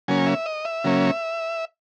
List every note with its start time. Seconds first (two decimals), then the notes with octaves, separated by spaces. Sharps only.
0.08 C#3 F#3 A#3 C#4 G#5
0.26 E5
0.46 D#5
0.65 E5
0.84 C#3 F#3 A#3 C#4